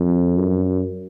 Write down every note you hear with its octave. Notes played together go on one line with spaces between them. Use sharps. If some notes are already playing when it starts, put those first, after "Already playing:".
Already playing: F2
F#2